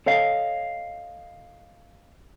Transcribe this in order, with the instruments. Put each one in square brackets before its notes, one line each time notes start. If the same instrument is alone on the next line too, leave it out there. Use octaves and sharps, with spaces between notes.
[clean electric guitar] A4 C#5 D#5 F5